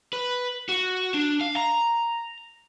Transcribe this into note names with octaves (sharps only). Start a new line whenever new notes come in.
B4
F#4
D4
F5
A#5